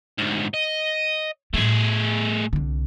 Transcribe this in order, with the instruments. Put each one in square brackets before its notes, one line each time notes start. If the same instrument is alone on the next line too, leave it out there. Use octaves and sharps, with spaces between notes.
[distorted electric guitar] D2 G#2
D#5
[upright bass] A2 G3 [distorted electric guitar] A3 G#4
[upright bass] C2 D3